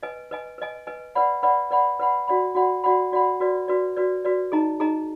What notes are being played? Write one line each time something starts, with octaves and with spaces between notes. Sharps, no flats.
B4 D#5 G#5
B4 D#5 G#5
B4 D#5 G#5
B4 D#5 G#5
B4 D5 F#5 B5
B4 D5 F#5 B5
B4 D5 F#5 B5
B4 D5 F#5 B5
F#4 D5 F#5 B5
F#4 D5 F#5 B5
F#4 D5 F#5 B5
F#4 D5 F#5 B5
F#4 B4 D5
F#4 B4 D5
F#4 B4 D5
F#4 B4 D5
D#4 G#4 D#5 A#5
D#4 G#4 D#5 A#5